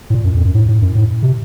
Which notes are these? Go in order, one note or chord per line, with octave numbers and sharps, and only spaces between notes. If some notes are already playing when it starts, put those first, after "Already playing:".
A2
A#2
F#2
F2
F#2
A2
A2
F#2
A2
C3